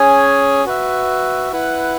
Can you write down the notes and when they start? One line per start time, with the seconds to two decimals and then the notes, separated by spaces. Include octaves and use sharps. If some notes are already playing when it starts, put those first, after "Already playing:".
Already playing: C#4 G#4 C#5 G#5
0.65 F#4 B4 E5
1.52 E4 B4 F#5